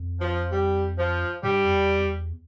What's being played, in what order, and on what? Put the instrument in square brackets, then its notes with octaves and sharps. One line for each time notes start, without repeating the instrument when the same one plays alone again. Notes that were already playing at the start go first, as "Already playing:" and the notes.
Already playing: [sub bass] F2
[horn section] F3
G3
F3
[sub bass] G2 [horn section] G3
[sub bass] F2
E2
F2
E2